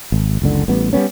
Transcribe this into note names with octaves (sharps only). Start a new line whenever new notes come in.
G#1
F#1 C#2 D3
A1 G3 B3
G3 A#3 B3 C#4